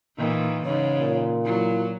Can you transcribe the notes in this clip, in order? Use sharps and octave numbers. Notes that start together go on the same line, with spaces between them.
A#2 D#3 E3
G#2 C#3 C#5
A#2
F#3 E4